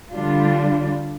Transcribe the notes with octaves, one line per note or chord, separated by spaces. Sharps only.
D3 G3 D4 F4